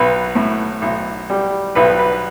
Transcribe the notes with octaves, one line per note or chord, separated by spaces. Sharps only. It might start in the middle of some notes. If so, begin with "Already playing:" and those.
Already playing: B1 B4
A2
B1
G3
B1 B4
B4